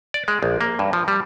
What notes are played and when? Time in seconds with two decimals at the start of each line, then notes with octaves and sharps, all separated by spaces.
0.14 D5
0.28 G#3
0.43 A#1
0.61 A#3
0.79 G2
0.93 F3
1.08 G3